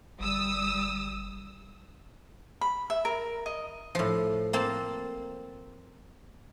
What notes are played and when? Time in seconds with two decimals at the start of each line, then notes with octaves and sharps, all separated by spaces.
0.20 G1 G3 D#6 E6
2.61 B5
2.90 E5
3.05 A#4
3.46 D#5
3.95 A2 F3
4.53 A#3 C4 A5